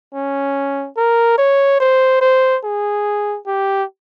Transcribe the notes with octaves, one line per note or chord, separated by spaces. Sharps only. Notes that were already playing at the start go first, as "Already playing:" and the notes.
C#4
A#4
C#5
C5
C5
G#4
G4